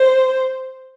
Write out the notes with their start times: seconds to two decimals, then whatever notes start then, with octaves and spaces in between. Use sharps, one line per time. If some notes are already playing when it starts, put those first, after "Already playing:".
Already playing: C5